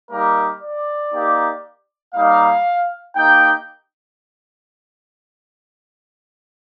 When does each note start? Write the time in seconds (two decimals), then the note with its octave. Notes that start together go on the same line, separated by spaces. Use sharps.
0.11 G3 A#3 D#4 G4 A#4
0.62 D5
1.13 A#3 D#4 G4
2.15 G3 A#3 D#4 F5
3.15 A#3 D#4 G4 G5